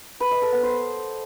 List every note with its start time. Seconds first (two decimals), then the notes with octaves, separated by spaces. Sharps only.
0.20 B4
0.31 D#5
0.42 A4
0.53 B3
0.63 C5